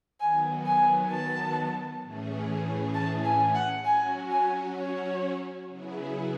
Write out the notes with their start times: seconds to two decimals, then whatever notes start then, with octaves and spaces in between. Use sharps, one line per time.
0.20 D#3 F#3 B3 G#5
0.66 G#5
1.12 A5
2.03 A2 E3 A3 C#4 G#4
2.95 A5
3.25 G#5
3.55 F#5
3.86 F#3 C#4 F#4 G#5
4.31 G#5
4.77 C#5
5.69 C#3 F#3 B3 E4 G#4